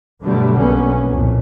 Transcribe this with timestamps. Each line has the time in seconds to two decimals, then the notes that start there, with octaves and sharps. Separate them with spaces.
0.21 G2 B2 D3 F#3 G3 A3
0.58 B1 A#3 B3 C#4
1.08 C2 F2 A#2